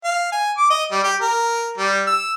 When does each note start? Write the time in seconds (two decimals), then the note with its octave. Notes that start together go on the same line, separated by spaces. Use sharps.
0.04 F5
0.32 G#5
0.57 D6
0.70 D#5
0.92 G3
1.04 G4
1.21 A#4
1.78 G3
2.07 E6